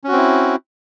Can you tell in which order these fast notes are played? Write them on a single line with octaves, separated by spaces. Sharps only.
C#4 F#4 C4 E4